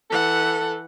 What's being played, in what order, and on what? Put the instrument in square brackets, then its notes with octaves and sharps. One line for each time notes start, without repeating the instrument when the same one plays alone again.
[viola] E3 F#5 [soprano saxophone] A4